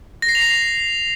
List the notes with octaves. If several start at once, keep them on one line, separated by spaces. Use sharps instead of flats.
A#6
C7
F7
C7